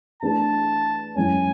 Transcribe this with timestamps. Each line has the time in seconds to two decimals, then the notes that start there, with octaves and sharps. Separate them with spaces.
0.23 E3 A3 D4 G#4 B4 A5
1.15 F#2 E3 G#3 C#4 G#5